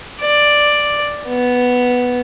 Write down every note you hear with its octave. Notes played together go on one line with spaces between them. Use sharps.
D5
B3